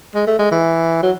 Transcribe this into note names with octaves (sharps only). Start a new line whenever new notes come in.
G#3
A3
G#3
E3
F#3